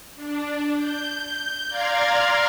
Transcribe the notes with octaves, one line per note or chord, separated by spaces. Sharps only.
D4
G6
D5 F5 A#5 C6 F6 G#6